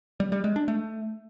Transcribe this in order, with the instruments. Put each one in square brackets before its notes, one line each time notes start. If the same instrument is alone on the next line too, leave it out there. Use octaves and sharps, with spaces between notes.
[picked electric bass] G3
G3
G#3
D4
A3